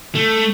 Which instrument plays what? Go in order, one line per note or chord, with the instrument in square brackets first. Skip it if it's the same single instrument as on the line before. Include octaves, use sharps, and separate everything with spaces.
[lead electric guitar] A3